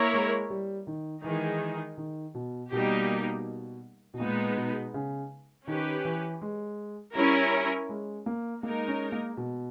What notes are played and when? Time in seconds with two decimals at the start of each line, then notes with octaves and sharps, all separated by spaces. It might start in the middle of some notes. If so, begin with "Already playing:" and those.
Already playing: A#3 E4 A#4 C#5
0.14 G#3
0.50 G3
0.87 D#3
1.24 D#3 E3 G#3 D#4 G#4
1.98 D#3
2.35 B2
2.71 B2 G3 A#3 D#4 G4
4.14 B2
4.20 A#2 G#3 B3 D#4
4.57 B2
4.94 C#3
5.67 D#3 C#4 G4 B4
6.05 E3
6.42 G#3
7.15 G3 C#4 E4 A#4
7.89 G#3
8.26 A#3
8.63 G#3 A#3 D#4 A#4
8.88 C#4
9.12 A#3
9.37 B2